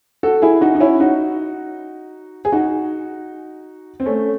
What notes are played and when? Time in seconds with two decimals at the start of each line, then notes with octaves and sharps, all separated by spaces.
0.23 F#4 A4
0.42 E4 G#4
0.61 D#4 F#4
0.75 D#4
0.80 C#4 E4
1.00 D#4 F#4
2.45 G#4
2.52 D#4 F#4
4.00 C4
4.06 A3 C#4